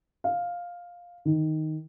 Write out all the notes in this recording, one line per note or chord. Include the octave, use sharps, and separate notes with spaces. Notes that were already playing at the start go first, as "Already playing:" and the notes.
F5
D#3